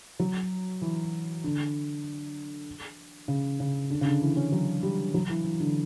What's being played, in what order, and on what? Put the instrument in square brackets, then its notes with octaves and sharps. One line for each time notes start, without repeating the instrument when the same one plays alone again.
[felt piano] F#3
E3
D3
C#3
C#3
D3
C#3
D3
E3
C#4
F#3
G3
F#3
E3
E3
D3